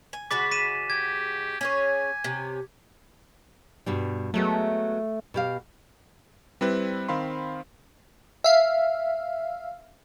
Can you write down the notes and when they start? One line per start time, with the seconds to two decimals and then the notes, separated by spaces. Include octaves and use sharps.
0.13 G#5
0.31 C#3 G#3 F#4 B5 D6 A6 B6
0.51 B6 D#7 E7
0.90 G4 G#6
1.61 C#4 G#4 C#5 G#5
2.24 C3 C#4
3.86 G2 B2 G3
4.34 F#3 G#3 A3 B3
5.34 B2 G4 F5
6.61 G3 C4 E4 B4
7.08 D#3 C4 F5 B5 C6
8.44 E5 F5